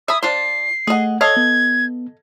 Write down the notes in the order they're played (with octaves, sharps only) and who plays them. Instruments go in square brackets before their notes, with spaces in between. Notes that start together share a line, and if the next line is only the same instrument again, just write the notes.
[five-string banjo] E5 G#5 B5 [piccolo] D#6
[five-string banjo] D4 F4 C5 [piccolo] C7
[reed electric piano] A3 F#5 [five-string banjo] G#4 D#5
[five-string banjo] A4 D#5 F5 [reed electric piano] C#5 [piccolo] G#6
[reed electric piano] B3